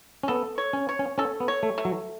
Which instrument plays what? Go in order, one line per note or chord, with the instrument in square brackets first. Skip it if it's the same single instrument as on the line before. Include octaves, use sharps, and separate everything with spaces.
[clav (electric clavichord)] C#4
[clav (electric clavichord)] B3 [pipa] A4
[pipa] C#5
[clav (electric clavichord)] C#4
[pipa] C#5
[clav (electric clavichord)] C#4
[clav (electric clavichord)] C#4 [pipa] A4
[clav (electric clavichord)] B3
[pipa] C#5
[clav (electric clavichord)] A3
[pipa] A3
[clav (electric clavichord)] F#3